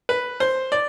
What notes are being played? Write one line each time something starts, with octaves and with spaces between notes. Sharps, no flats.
B4
C5
D5